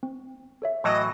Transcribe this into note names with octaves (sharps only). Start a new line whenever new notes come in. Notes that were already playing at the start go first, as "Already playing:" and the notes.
C4
A4 C#5 E5
A2 E3 F#3 D#5 C#6 F6 A#6